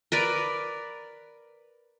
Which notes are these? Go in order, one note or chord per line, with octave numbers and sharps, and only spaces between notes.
A#4 B4 D5